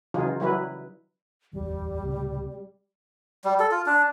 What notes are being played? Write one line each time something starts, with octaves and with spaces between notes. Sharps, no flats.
C#3 E3 F#3 D#4 F4 G#4
F#3 G3 E4 B4
D1 G1 E2 G3
C#2 A2 C3
G3
A4
F4
D4